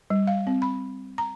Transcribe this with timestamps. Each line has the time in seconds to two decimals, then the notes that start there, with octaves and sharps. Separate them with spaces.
0.10 G3
0.27 F5
0.47 C4
0.62 B5
1.18 A#5